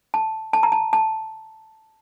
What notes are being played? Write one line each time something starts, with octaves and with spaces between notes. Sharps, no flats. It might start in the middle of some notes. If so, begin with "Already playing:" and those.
A5
A5
A#5
A5
A5